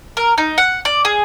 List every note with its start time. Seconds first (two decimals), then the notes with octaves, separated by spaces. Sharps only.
0.17 A#4
0.38 D#4
0.58 F#5
0.85 D5
1.05 G#4